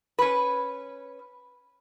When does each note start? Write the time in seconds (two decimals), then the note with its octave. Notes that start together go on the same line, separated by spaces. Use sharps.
0.19 C#4 B4